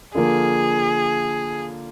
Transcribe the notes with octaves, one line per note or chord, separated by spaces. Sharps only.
D3 F3 A#3 G#4